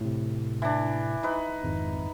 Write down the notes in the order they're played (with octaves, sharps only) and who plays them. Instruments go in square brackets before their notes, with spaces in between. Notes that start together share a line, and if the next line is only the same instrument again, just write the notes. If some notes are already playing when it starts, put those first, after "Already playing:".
[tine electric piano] A2 C3
[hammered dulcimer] E3 D4
D#4 B4
[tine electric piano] G#1 F2